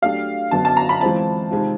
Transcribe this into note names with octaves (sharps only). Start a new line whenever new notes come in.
F#3 A3 D4 G4 F5
F#2 D3 F#3 B3 A5
A5
A#5
B5
E3 G#3 C4 F4 A5
C3 D#3 G#3 C4 F4